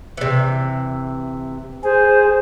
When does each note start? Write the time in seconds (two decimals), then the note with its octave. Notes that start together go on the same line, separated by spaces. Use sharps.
0.17 C3 E3
1.84 G#4 C5